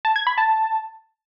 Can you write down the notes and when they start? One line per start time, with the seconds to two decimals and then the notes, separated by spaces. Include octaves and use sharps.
0.05 A5
0.16 G#6
0.27 B5
0.38 A5